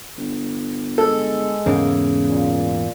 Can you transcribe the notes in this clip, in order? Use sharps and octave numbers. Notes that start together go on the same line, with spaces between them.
G1
G#3 A4
E2 G#2 C#3 A#3
A#2